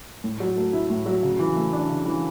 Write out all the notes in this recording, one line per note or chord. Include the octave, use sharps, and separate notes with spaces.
A2
F#3
A3
E4
A2
F#3
C#3
E3
A3
D4
C#3
E3